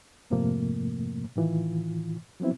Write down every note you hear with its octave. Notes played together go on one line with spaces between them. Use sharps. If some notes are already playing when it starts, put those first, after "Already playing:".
F2 G#2 C3 F3 A3 A#3
A2 D#3 E3 F4
F3 F#3 B3 C4 E4